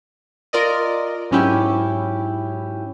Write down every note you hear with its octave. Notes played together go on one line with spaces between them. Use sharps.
F4 A#4 D5 D#5
G#2 F#3 C#4 E4 G4